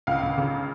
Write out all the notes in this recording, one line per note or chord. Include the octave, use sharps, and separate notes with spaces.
C#2 F5
C#2
C#3